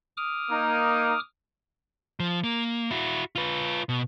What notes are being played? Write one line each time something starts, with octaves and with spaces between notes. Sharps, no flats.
D6 D#6 F6
A#3 D#4
F3
A#3
E4 F#4
F4 B4
B2